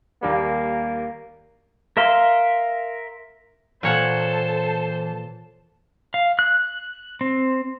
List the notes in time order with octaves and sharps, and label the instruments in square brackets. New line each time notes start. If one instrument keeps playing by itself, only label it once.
[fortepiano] D#2 G3 [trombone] A#3
[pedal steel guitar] A#4 E5 F5 C6
[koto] A#2 C#5 F#5 [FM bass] E3 [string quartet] A4 A5 [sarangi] C5
[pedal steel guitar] F5
F#6
C4